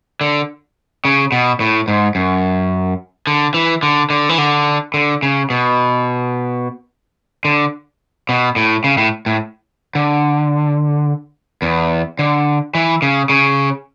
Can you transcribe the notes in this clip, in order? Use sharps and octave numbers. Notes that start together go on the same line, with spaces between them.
D3
C#3
B2
A2
G#2
F#2
D3
E3
D3
D3
E3
D3
D3
C#3
B2
D3
B2
A2
C#3
A2
A2
D3
E2
D3
E3
C#3
C#3